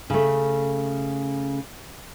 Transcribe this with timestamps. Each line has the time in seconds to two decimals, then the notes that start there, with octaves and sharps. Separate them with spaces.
0.10 C#3 A3